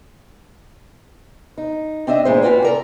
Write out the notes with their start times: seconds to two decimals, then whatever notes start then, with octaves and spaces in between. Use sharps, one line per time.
1.58 D#4
2.07 C4 D4 D#5 E5
2.25 E2 A#2 G#3 C5
2.42 C#4 F4 F#4 B4 G5
2.62 A4 A#4 D5